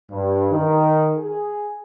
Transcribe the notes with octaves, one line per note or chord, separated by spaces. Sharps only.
G2
D#3
G#4